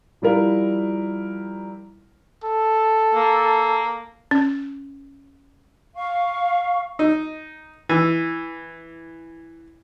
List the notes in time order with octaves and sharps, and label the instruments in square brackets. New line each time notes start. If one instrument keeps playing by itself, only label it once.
[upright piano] F3 G3 E4 A#4 F5
[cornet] A4
[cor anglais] A#3
[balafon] C#4
[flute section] F5 C#6
[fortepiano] D#4
E3